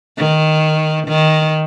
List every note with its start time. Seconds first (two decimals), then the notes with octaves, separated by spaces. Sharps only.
0.18 D#3
1.08 D#3